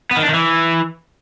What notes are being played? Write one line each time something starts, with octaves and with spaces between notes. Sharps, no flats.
B3
D#3
D4
D#3
E3